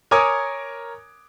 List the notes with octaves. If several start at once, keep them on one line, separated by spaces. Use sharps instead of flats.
A#4 C#5 G#5 D6 D#6 G#6